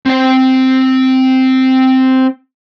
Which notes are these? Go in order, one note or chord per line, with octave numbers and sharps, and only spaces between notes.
C4 G5